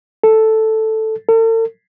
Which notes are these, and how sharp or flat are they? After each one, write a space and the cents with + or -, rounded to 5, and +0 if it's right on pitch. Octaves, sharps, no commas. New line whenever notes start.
A4 +0
A4 +45